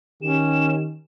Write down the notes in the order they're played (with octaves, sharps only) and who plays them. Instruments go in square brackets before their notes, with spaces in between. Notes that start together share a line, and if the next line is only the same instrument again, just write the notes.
[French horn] D#3 [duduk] C#4 [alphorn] G4 [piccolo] E7